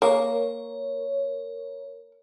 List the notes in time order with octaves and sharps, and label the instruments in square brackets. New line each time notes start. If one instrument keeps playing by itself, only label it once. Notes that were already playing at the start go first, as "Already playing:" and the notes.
[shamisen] A#3 [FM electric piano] A#4 C#5